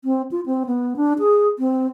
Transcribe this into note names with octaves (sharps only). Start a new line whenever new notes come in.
C4
F4
C4
B3
D4
G#4
C4